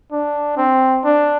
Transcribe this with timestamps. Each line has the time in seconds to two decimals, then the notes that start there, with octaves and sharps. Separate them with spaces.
0.12 D4
0.57 C4
1.04 D4